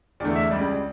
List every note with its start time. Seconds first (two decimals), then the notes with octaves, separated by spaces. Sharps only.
0.20 E2 D3 A3 D5
0.35 E5
0.51 C#2 C#3 G3 C#4 D5